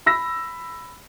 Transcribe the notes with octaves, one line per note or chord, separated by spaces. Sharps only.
B5 E6 A#6